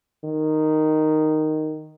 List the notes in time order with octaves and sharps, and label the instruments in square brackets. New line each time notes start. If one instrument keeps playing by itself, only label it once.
[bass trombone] D#3